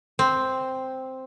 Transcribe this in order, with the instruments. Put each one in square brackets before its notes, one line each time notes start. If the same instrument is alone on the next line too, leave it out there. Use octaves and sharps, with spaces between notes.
[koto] C4